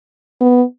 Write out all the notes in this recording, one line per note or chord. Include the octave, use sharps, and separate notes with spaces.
B3